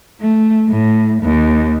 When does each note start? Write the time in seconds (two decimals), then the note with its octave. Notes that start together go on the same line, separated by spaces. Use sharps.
0.21 A3
0.68 A2
1.22 D#2